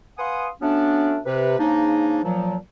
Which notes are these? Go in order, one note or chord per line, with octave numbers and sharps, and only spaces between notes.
B4 F5 F#5 G#5 C6 D#6
F#3 A3 B3 C#4 D4
C3 B4
G#2 C#3 A#3 D4 D#4
A#2 F3 F#3